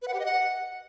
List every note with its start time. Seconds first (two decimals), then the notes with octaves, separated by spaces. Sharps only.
0.02 B4
0.08 F#5
0.14 G4
0.20 D#5
0.25 F#5